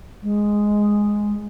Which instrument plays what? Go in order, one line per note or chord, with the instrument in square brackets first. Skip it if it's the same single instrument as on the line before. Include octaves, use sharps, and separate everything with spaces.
[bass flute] G#3